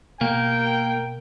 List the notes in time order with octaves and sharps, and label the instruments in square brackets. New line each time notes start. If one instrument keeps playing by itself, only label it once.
[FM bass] B2 [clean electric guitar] A#3 [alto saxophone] A#4 [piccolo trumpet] G5